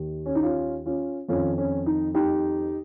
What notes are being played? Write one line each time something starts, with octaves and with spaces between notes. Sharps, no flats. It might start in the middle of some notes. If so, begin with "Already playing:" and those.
Already playing: D#2 D#3
C#4
D#4
C#4 F4
C#4 F4
F2 D#3 C#4 F4
C#4
D#4
D#4 G4